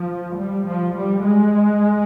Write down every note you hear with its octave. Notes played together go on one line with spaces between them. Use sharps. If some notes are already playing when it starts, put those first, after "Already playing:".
Already playing: F3
G3
F3
G3
G#3